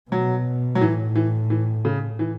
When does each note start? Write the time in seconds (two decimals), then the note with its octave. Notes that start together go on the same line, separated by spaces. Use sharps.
0.11 B2 F#3
0.75 F#3
0.81 A2 E3
1.15 E3
1.50 E3
1.85 C#3
2.19 E3